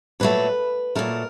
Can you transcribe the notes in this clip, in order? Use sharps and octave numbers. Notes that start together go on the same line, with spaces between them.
A#2 F#3 A3 B4
A#2 F#3 A3 A#4